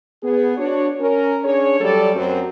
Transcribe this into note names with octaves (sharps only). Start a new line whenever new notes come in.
B3 G#4
D4 F#4 C#5
C#4 A#4
C#4 D4 G#4 C#5
F#3 G3 A3 G4 A4 D5
F#2 F#3 C4